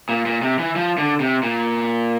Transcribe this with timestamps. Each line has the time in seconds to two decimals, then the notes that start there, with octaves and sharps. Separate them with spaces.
0.09 A#2
0.26 A#2
0.42 C3
0.59 E3
0.76 F3
0.98 D3
1.20 C3
1.43 A#2